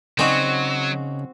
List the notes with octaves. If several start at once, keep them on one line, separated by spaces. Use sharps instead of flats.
C#3 F#3 C4 D#4 F#4 G#4 D5